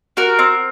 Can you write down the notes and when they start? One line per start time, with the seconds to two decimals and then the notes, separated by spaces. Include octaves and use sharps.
0.17 F#4 A#4
0.39 C4